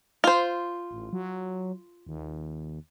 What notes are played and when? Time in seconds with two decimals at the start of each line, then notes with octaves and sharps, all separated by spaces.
0.24 F4 C5
0.91 A1
1.13 F#3
2.07 D#2